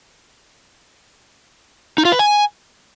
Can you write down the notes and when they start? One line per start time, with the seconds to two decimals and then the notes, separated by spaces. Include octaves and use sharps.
1.98 D#4
2.05 F4
2.12 B4
2.19 G#5